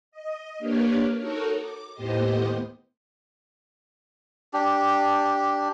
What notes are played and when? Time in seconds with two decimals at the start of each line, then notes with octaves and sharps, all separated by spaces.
0.12 D#5
0.58 A#3 D4 G4 A#4 B4 C#5
1.18 D#4 F#4 A4 A#4 C#5
1.59 D6
1.94 D#2 A2 B3 G4 C5 D#5
4.53 D4 G4